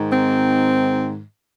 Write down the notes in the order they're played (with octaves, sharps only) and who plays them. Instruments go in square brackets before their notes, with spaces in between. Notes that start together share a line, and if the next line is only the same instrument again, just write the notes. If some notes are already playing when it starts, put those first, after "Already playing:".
Already playing: [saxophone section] G#2 D#3
C4